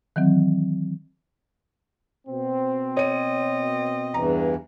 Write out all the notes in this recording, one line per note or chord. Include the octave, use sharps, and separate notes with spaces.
D#3 E3 F#3 C4
B2 C4
C#5 D#5 D#7
E2 G2 E3 A#5